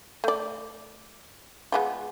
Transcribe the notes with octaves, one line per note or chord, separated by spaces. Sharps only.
A3 D5
G#3 B3 F4